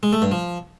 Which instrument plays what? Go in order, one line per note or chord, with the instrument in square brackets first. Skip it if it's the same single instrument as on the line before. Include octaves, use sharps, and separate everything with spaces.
[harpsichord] G#3
A3
G2
F3